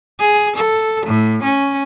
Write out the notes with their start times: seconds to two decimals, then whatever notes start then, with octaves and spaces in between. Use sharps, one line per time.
0.20 G#4
0.56 A4
1.06 A2
1.43 C#4